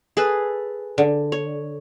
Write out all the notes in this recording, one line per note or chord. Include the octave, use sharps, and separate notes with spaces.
G#4 A4 B4
D3
C#5